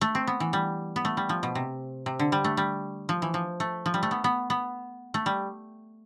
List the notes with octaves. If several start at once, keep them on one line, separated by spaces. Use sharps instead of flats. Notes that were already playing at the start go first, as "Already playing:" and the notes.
A3
C4
B3
E3
G3
B3
A3
G3
F3
B2
C3
C3
D3
G3
A3
G3
F3
E3
F3
A3
F3
G3
A3
B3
B3
B3
A3
G3